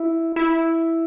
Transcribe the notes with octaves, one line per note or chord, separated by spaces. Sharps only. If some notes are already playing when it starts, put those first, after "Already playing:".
Already playing: E4
E4